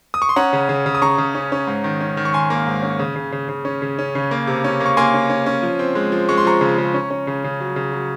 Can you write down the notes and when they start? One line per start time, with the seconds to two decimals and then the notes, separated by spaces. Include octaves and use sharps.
0.14 D#6
0.22 C#6
0.29 C6
0.36 C#4 F#5 A#5
0.53 C#3
0.69 C#3
0.86 C#3
0.95 D#6
1.02 C#3 A#5 C#6
1.18 C#3
1.35 C#4
1.52 C#4
1.67 G#2
1.84 D#3
2.01 C#4
2.17 D#3
2.25 C#6
2.33 D#3 G#5 C6
2.50 A#3
2.67 G#2
2.83 C#4
2.99 C#3
3.16 C#3
3.32 C#3
3.49 C#3
3.65 C#4
3.82 C#3
3.99 C#4
4.15 C#3
4.31 A#3
4.47 C3
4.64 C#4
4.80 A#3
4.86 C#6
4.97 A#3 G#5 C6
5.14 C#4
5.30 C#4
5.46 C#4
5.63 F3
5.79 C4
5.95 G#3
6.12 F3
6.29 G#3 C#6
6.38 C6
6.45 F3 A#5 C#6
6.61 C#3
6.78 C#3
6.94 C#4
7.10 C#4
7.27 C#3
7.44 C#3
7.60 F#3
7.76 C#3
7.93 F#3